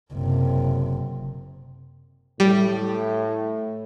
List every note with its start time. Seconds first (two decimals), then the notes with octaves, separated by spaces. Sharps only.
0.13 F#1 C3
2.40 A2 G3